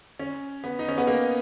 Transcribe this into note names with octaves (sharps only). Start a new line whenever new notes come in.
C#4
B3
D#4
C#4
B3
A#3